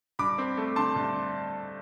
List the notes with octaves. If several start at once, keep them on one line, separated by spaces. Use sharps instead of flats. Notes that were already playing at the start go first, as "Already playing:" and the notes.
G2 B5 D6
C4
A3
D3 A5 C6
G2